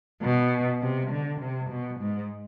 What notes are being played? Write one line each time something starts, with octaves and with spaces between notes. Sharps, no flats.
B2
C3
D3
C3
B2
G#2